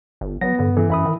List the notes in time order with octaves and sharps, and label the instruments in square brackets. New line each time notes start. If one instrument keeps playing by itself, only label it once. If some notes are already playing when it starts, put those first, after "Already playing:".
[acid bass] G1
[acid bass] F#3 [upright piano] B3 [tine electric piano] A#6
[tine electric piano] G2 [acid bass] D3
[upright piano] E3 [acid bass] A4
[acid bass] F#2 [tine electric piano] E5 B5 D#6
[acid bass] D#3